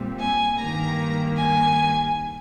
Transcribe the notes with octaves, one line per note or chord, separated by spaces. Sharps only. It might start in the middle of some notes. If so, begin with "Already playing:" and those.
Already playing: A#2 G3 C4
G#5
G2 D#3 G3 A#3 A#5
G#5